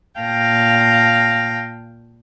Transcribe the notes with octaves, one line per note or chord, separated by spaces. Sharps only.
A#2 F5 G5 A5 A#6